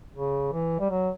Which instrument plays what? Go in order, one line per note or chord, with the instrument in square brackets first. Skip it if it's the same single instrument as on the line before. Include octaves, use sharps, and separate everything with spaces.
[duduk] C#3
E3
G3
F#3